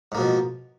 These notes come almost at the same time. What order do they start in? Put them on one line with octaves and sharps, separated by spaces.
G#2 A#3 B2 F3